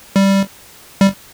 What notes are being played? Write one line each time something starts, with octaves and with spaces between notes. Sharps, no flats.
G3
G3